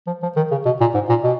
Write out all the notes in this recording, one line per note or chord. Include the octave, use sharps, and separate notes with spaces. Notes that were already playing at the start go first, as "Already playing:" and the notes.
F3
F3
D#3
C#3
B2
A#2
G#2
A#2
B2